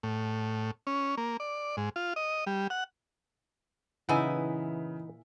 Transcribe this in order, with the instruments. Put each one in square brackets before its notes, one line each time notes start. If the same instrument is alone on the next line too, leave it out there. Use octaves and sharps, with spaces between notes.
[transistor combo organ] A2
C#4
A#3
D5
G#2
F4
D#5
G3
F#5
[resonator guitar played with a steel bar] A#2 E4 G#5 [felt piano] C#3 [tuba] E3 [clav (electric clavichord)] D#4 B4 F#5